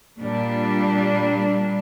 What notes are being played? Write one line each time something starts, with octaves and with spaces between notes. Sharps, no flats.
A#2 G3 D4